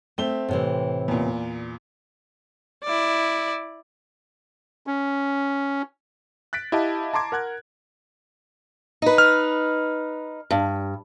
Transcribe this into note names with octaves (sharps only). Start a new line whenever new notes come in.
A3 C4 E5 G7
A2 C3 E3
E2 A#2
E4 D5
C#4
F#6 A6 B6 D7
E4 G4 D#5 F5 A5
A5 A#5 C6 D6 G#6
A#4 F#5 F#6 G#6
D#4 B4
F6
G2